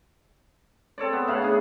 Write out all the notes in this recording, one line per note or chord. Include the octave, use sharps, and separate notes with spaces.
C4 A4 C#5 D5
B3
A2 C#3 F5 F#5
D4 G#4